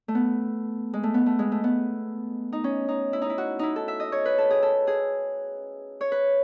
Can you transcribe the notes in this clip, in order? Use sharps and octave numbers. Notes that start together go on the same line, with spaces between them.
A3
B3
G#3
A3
B3
A3
G#3
A3
B3
D#4
C#4
D#4
E4
D#4
E4
F#4
D#4 E4
A4
E5
D#5
C#5
B4
A4
G#4
A4
G#4
C#5
B4